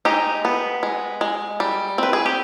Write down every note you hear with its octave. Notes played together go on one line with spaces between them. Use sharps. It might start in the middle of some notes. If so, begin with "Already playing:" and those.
G#3 D#4 G4
B3
G#3
G#3
G3
C4 B4
G#4
G4